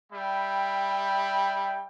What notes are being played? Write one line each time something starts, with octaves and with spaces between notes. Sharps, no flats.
G3 E5 G5 B5